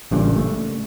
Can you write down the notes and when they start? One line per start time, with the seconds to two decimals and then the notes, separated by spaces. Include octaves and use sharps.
0.11 A1 G2 A#2 C#3
0.36 A3